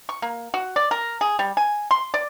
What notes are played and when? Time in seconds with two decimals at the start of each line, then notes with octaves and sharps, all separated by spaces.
0.09 C#6
0.22 A#3
0.54 F#4
0.76 D5
0.91 A#4
1.21 G#4
1.39 G3
1.57 G#5
1.91 C6
2.14 D5